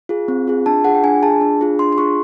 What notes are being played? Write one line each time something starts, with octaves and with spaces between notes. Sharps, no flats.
F4 G#4
C4
F4 G#4
D4 A5
F4 G#4 F#5
G5
D4 G#5
F4 G#4 A5
D4
F4 G#4
D4 C6
C6
F4 G#4 C#6